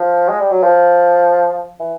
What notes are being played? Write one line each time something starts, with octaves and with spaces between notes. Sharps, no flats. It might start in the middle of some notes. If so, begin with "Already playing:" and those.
Already playing: F3
G#3
G3
F#3
F3
E3